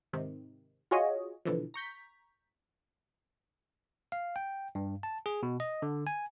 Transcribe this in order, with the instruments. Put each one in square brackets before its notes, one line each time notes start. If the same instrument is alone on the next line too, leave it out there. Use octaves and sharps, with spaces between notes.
[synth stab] G#2 C3 D#3
F4 F#4 G#4 C#5 D#5
B2 D3 E3 F3
A#5 C#6 G6 B6
[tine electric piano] F5
G5
G2
A5
G#4
B2
D#5
D3
G#5